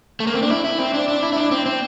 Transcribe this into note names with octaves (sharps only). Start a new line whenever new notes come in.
A3
A#3
C4
D4
E4
E4
C4
D4
D4
E4
E4
D4
C4
C4